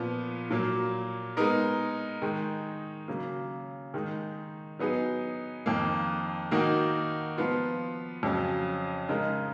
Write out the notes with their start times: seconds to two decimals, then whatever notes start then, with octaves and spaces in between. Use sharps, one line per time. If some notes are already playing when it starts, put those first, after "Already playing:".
Already playing: A#2 F3 B3
0.50 A#2 F#3 A#3
1.36 G#3 B3 D#4 A#4 D#5
2.22 D#3 G#3 D#4
3.08 C#3 F#3 A#3
3.94 D#3 G#3 D#4
4.79 F#3 B3 D#4 G#4
5.66 F2 D#3 A#3
6.51 D#3 A#3 D#4 F#4 A#4
7.38 F3 B3 F4
8.23 F2 C#3 F#3 C#4
9.09 C#3 G#3 D#4 A#4 D#5